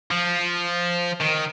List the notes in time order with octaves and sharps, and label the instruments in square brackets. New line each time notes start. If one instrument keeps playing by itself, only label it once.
[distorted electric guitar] F3
D#3